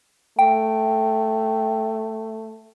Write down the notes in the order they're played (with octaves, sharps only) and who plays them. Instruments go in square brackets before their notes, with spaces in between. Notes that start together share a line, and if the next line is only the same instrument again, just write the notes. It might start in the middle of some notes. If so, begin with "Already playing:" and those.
[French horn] A3 [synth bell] G5